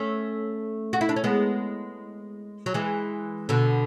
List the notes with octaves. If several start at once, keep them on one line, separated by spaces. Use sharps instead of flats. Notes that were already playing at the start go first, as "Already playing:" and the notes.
Already playing: A3 C#4
F#4
E4
D4
C#4
G#3 B3
F#3
E3 G#3
B2 D3